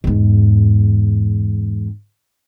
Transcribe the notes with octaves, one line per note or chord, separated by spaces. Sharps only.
E2 G#2